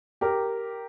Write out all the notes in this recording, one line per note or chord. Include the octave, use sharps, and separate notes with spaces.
G4 A#4